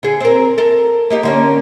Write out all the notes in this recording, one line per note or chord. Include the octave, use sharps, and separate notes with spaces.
D3 G#4
C4 A#4
A4 A#4
A#3 D#4 G4
D3 A#3 C#4